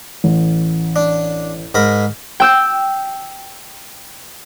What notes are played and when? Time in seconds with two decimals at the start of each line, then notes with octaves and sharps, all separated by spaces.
0.24 A1
0.96 D4
1.75 G#2 A#4 B5
2.40 G5 E6 G6